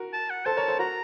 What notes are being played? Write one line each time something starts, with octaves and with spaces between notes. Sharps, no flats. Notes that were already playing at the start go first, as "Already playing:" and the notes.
Already playing: F#4 A#4
A5
F#5
A4 C5 A5
A#4 C#5
A4 C5
F#4 A#4 A#5